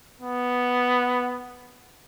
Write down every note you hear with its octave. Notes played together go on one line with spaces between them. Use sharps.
B3